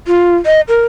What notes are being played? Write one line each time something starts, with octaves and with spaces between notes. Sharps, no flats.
F4
D#5
A#4